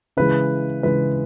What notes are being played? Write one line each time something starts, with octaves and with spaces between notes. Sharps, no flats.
C#3 E3 G#3 B4
C#3 E3 G#3 B4